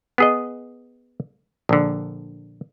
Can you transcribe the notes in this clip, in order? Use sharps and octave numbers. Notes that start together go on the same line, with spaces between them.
B3 G#4 D#5
A#1 D3